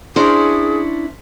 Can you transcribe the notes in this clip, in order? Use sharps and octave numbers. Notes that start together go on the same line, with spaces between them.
C#4 D4 E4 G#4 A#4 C5